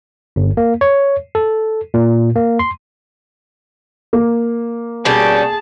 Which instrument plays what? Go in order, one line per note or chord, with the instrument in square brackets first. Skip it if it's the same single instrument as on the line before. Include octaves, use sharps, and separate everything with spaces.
[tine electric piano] G1
A#3
C#5
A4
A#2
A#3
C6
[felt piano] A#3
[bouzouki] B2 G3 C#4 [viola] G#4 A5